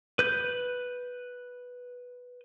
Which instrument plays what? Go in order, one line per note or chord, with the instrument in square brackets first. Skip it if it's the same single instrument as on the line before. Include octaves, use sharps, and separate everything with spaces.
[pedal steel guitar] B4 G6